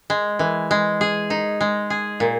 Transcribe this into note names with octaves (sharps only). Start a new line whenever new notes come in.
G#3
E3
G#3
G#4
D#4
G#3
G#4
A#2